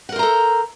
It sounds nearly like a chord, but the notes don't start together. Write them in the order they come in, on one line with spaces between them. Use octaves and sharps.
F#5 A#4 C5 A#5 A4